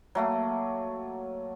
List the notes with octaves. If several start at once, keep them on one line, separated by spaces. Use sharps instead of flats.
F#3 A3 A#3